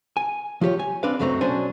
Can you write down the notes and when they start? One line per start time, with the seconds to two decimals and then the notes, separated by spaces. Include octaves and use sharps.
0.17 G#5
0.61 F3 F4 G4 C#5
0.79 G#5
1.03 C4 D4 B4 F5
1.19 C#2 F#2 F#3 A3 C4 A#5
1.41 B1 F#3 C#4 D4 C5 G#5